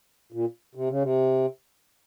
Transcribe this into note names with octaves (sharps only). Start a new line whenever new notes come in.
A#2
C3
C#3
C3